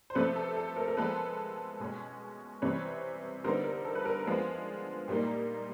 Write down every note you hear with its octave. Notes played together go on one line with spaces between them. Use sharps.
C5
C3 F3 A3 A4 B4
A4
A4
A#4
A#4
F3 G#3 B3 A4 B4
B2 G#3 C#4
C3 E3 G3 C4 B4 C#5
D3 G3 B3 D#4 A#4 C5
A#4
A4
B4
A#4
F3 G#3 B3 D4 F4
A#2 G3 A#3 D#4